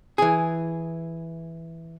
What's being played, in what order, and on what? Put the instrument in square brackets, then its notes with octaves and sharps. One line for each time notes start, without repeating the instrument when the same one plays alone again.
[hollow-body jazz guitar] E3 G#4